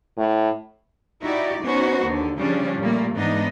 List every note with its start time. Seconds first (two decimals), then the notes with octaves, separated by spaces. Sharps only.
0.18 A2
1.21 D#4 E4 F#4 G4 D5
1.62 B3 C#4 D#4 F#4 B4 C5
2.04 D#2 D3
2.37 C#3 F3 G3 C#4 D4
2.79 A#2 G3 A3 A#3
3.15 G#2 E3 B3 D4 D#4 D#5